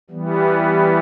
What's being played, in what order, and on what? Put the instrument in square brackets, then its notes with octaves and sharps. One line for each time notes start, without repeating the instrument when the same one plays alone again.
[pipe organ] E3 G3 B3